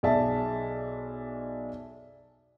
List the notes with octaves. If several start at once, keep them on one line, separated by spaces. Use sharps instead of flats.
B1 G#4 D5 E5 A5